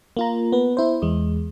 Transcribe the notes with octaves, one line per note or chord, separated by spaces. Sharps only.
A#3 F4 A#5
B3 B4
B3 E4 C5
E2 G#3